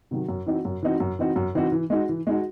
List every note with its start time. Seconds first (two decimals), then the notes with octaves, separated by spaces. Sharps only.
0.11 C3 D#3 F#3
0.29 F#2
0.46 E3 C4 D#4 F#4
0.65 F#2
0.83 E3 C4 D#4 F#4
1.00 F#2
1.19 E3 C4 D#4 F#4
1.36 F#2
1.55 E3 C4 D#4 F#4
1.72 E3
1.90 G#3 D#4 F#4
2.09 E3
2.27 G#3 D#4 F#4